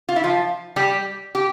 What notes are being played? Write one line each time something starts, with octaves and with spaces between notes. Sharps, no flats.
F4
E4
F3 F4
G3 G4
G4